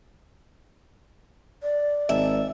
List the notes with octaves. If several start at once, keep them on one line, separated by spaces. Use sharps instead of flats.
D5
G#1 E5